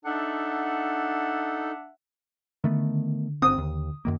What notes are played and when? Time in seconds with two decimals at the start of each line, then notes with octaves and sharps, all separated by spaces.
0.05 D4 D#4 A4 E5 F#5
2.64 D3 D#3 A3 B3
3.42 G1 C4 D#6
3.58 D#2
4.05 F#2 D#3 A#3